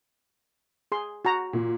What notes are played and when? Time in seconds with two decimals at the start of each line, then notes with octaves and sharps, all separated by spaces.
0.92 G#4 C6
1.25 F#4 A#5
1.53 A#2